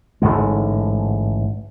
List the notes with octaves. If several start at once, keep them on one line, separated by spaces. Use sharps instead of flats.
A1 G#2 D3 G#3